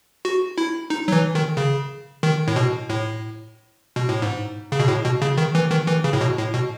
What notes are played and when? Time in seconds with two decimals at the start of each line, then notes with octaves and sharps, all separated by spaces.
0.25 F#4
0.58 E4
0.90 D#4
1.08 F#3
1.12 E3
1.35 D#3
1.57 C#3
2.23 D#3
2.48 A2
2.56 B2
2.90 A2
3.96 B2
4.09 A2
4.22 G#2
4.72 C#3
4.80 B2
4.88 A2
5.04 B2
5.22 C#3
5.37 D#3
5.55 E3
5.71 D#3
5.87 E3
6.04 C#3
6.13 A2
6.21 B2
6.38 A2
6.54 B2